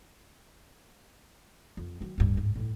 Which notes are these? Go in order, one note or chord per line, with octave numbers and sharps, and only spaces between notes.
F2
D#3 F#3
D1 G2
G#2
A2 E4